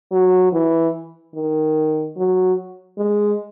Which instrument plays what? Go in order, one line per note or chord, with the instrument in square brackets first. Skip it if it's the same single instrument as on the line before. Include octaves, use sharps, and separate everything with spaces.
[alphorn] F#3
E3
D#3
F#3
G#3